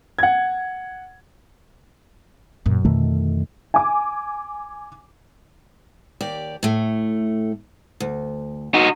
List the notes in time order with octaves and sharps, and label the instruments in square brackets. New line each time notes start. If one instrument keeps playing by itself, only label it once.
[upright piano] F#5 G#6
[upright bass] F#2 A#2
[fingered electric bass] F2 D#3 A3 [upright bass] B2 D3
[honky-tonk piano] G#5 D6
[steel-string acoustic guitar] D#2 G4 D5
A2 A3
D2
[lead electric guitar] D#4 F#4